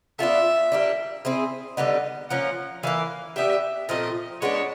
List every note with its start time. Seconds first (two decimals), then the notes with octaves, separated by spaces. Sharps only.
0.19 B3 D4 F4 A4 E5
0.72 G3 A#3 D4
1.25 C4 E4 G#4
1.77 D3 G3 B3 D#4
2.30 F3 A#3 C#4 F#5
2.83 E3 G3 A#3 F5
3.36 B3 D4 G4 E5
3.89 A#2 F3 A3 C4 D#5
4.41 G#3 B3 D4 C#5